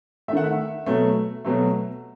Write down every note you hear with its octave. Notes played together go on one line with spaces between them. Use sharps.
D#3 A3 E5 F#5
E5
B2 F#3 A3
B2 F#3 A3